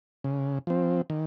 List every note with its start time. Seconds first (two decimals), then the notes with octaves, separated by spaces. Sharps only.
0.24 C#3
0.67 F3 C4
1.10 D#3